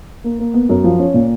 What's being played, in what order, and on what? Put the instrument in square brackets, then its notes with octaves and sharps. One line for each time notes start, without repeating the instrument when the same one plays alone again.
[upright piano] A#3
A#3
B3
F#2
F3
C#4
A#2